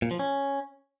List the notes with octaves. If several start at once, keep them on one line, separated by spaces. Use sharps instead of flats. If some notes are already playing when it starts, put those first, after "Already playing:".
A#2
F3
C#4